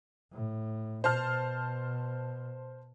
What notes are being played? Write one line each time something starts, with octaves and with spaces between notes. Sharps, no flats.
A2
B2 C5 A5 F6